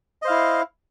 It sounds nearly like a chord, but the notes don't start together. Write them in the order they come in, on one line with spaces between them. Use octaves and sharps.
D#5 C5 F5 E4